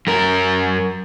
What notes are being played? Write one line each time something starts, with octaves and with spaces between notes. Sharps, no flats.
F#2 A#4